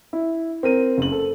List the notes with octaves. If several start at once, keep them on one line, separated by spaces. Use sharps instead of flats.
E4
C4 A#4 D#7
F#1 F#7
A4